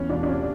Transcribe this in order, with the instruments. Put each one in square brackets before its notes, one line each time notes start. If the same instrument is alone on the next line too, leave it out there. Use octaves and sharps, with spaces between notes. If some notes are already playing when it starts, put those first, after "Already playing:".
Already playing: [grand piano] E2 [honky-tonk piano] C#4
[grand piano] E1 [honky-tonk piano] D4
[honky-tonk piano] D4
[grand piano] C3 [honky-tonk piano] C#4